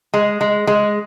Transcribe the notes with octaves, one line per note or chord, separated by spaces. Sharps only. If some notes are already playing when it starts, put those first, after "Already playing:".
G#3
G#3
G#3